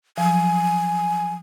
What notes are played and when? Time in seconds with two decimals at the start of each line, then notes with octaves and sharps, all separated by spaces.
0.18 F3 F#3 G#5